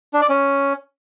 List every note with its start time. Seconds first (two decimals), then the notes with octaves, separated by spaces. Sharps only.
0.14 D4
0.22 D5
0.29 C#4